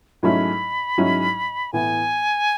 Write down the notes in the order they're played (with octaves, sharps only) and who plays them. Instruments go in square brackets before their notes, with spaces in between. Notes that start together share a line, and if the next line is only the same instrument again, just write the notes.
[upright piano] G#2 F#3 A3 C#4 E4 [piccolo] B5
[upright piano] G#2 F#3 C#4 E4
[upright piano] A2 E3 B3 E4 [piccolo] G#5